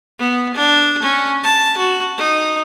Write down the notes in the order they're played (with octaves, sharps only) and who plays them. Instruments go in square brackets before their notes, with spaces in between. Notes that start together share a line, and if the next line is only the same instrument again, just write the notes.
[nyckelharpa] B3
D4
C#4
A5
F#4
D#4